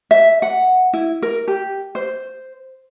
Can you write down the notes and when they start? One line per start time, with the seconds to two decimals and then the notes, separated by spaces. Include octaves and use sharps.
0.11 E5
0.42 F#5
0.93 E4
1.22 A#4
1.48 G4
1.95 C5